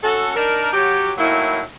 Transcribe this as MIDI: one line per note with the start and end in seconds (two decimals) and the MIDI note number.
0.03 0.33 61
0.03 0.33 66
0.03 0.33 69
0.35 0.71 62
0.35 0.71 63
0.35 0.71 70
0.72 1.11 54
0.72 1.11 67
1.17 1.60 45
1.17 1.60 51
1.17 1.60 54
1.17 1.60 58
1.17 1.60 64